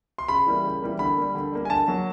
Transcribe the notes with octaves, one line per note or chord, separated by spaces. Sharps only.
C6
C#3 B5
E3 G3 A#3
C#3
E3 G3 A#3
D3 B5
G3 A#3
D3
G3 A#3
G#5
D3 A5
F#3 A#3